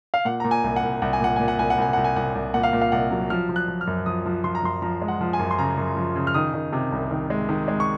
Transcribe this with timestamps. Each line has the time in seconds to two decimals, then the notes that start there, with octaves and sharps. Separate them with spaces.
0.14 F5
0.25 A#2 F#5
0.40 A#2 A#5
0.51 G#5
0.64 C2
0.76 F#5
0.83 C2
1.02 C2 F#5
1.13 G#5
1.20 A#2 F#5
1.36 A#2 G#5
1.48 F#5
1.59 C2 G#5
1.70 F#5
1.78 C2 G#5
1.93 C2 F#5
2.04 G#5
2.16 C2 F#5
2.35 C2
2.54 A#2 F#5
2.63 F5
2.73 A#2
2.81 F5
2.92 C2 F#5
3.11 F#3
3.30 F3 F6
3.49 F3
3.56 F#6
3.68 F3
3.81 F6
3.87 F#2
4.06 F3 D#6
4.26 F3
4.44 F3 C6
4.55 A#5
4.63 F#2 C6
4.82 F3 A#5
5.02 G#3
5.08 F#5
5.21 F3
5.33 G#5
5.39 F#2
5.51 C6
5.59 C#3 A#5
5.77 F#2
5.96 F3
6.16 C#3
6.27 F6
6.34 D#3 D#6
6.54 D#3
6.73 C3
6.92 C2
7.11 D#3
7.30 G#3
7.49 D#3
7.68 G#3
7.80 C#6